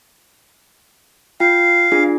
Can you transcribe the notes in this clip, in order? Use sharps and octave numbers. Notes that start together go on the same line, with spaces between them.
F4 F5 G5
D4 F4 G#4